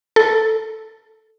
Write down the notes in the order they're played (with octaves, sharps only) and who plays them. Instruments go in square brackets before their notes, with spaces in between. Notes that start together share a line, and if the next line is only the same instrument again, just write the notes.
[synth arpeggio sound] A4